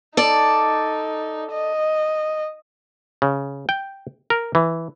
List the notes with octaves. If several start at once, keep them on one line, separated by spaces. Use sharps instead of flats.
D#4 A4 D5
D#5
C#3
G5
A#4
E3